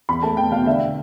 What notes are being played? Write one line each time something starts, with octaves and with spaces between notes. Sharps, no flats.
E2 B5
A3 A5
E2 G5
B2 F5
D3 E5